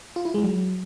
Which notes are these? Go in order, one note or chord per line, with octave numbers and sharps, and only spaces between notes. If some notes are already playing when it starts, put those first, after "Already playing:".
F4
E4
G#3
F#3